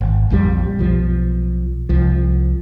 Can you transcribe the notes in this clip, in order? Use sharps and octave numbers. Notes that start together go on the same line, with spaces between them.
G#1
A#1 F2 C#3 G3
B1 F3
C2 F3